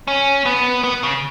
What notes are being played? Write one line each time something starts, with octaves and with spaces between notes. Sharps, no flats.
C#4
B3
B3
C#3